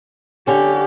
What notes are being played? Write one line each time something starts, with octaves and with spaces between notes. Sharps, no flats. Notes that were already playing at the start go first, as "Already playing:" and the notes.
D3 C#4 G4